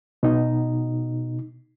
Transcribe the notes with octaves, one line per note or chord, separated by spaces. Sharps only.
B2 D#4